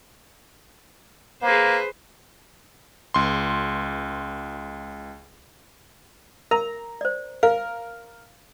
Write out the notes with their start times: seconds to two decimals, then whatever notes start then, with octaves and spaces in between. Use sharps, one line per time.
1.42 A#3 G#4 B4 C5
3.14 C#2 C6
6.51 A#4 A#5
7.01 C5 D5
7.43 A#4 F5